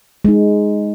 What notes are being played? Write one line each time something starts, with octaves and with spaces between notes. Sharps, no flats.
G#3 D#4